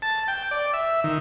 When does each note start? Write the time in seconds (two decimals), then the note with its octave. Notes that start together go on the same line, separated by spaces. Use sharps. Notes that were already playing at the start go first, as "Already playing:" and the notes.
0.02 A5
0.28 G5
0.51 D5
0.73 E5
1.04 D#3